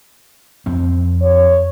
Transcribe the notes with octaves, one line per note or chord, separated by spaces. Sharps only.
F2 C4
C#5